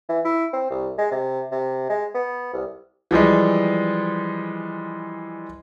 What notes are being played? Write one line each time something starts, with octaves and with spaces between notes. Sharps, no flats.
E3
E4
C4
C2
G#3
C3
C3
G#3
B3
C2
E3 F3 G3 G#3